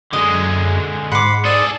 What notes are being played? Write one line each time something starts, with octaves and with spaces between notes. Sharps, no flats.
F#2 D3 G#3 D#5
G#2 F#5 B5 C6 D6
G#4 A4 D5 D#6